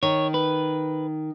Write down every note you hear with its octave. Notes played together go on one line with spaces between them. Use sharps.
D#3 C#5
B4